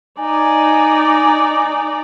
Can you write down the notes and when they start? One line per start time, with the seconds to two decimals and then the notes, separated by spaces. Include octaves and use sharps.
0.19 D#4 D5 G#5